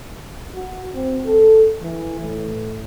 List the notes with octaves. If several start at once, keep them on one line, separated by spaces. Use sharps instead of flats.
F#4
C4
A4
E3
A2